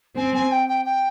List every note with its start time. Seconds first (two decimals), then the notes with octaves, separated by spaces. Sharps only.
0.17 C4 G#5
0.34 G#5
0.51 G5
0.68 G5
0.85 G5